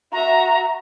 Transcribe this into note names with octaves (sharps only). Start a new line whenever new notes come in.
F#4 E5 A#5